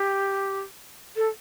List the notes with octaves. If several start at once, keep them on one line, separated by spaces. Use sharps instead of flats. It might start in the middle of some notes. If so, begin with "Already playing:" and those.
Already playing: G4
A4